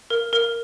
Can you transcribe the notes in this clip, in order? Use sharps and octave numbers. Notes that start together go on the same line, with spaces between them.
A#4
A#4